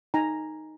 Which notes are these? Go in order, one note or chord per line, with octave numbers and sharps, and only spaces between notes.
D#4 G#5 A#5